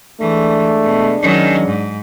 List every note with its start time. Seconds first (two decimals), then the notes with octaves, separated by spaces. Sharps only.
0.20 E3 G#3 A3 D4
0.83 B2
1.22 D#3 F#3 C#4
1.67 G#2